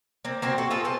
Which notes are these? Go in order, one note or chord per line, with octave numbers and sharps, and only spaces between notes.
A#3 C4
A#3 C4 F#4 G5
F#4 A4
F4 G#4 A4
B3 C4 A4